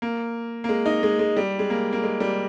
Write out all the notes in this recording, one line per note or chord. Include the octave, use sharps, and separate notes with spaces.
A#3
A#3
G#3
D#4
G#3
G#3
G3
G#3
A#3
A#3
G#3
G3